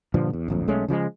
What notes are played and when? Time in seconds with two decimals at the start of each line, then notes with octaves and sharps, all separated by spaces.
0.14 G2 A#2 D3 F3
0.33 E2
0.48 D1 A#1 F2
0.68 B1 G#3 A3 C#4
0.88 C#3 F3 G3 G#3